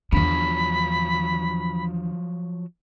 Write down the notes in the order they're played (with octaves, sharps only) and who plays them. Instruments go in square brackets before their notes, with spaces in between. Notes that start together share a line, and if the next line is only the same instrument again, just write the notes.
[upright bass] E2 D3 [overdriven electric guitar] F3 F#3 [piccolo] B5